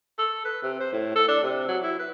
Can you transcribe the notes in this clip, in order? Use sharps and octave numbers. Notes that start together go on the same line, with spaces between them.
A4
B4
C3
C5
A2
A4
D4
C3
F#3
E4
B4